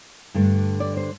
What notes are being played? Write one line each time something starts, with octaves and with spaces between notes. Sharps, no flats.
G2 D3 A3
D5
C5